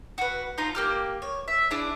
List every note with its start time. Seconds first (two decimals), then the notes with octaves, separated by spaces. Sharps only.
0.18 F#4 B4
0.58 D#4 F4 A#5
0.75 A#3 G4 F6
1.22 C#5
1.48 E5
1.71 D4 E4 G#4